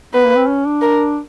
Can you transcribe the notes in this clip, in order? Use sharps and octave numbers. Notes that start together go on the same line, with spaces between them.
B3 B4
A#3
C4
C#4
D4
A#4